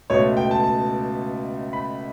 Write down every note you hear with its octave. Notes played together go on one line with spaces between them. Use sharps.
C#2 B2 A3 C#5
G5
A5
A5
B5